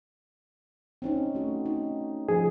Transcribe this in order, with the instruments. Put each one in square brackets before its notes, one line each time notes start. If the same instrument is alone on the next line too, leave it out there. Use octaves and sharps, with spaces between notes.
[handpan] C4 C#4 D#4
A3 F#4
D#4
[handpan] F3 [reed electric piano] G#4